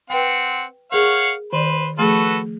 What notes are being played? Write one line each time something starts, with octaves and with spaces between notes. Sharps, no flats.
C4 B4 F#5 G5
G#4 A#4 C#5 F5 F#5
D#3 B4 C5 D5
F3 A3 F#4 G#4 A4 B4